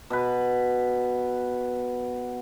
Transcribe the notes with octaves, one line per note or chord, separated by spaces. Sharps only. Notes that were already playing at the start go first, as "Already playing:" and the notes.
B2 B4